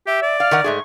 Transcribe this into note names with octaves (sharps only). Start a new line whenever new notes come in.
G4 E5
D5
F5 F6
D#3 A#4 F#5
G#2 A3 G#4 C#6